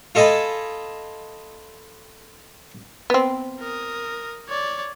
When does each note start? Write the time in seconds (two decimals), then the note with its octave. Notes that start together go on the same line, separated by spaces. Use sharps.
0.15 F4 A4 D#5 G#5 A5 B5
3.10 B3 C4
3.60 A#4 D#6
4.49 C#5 D5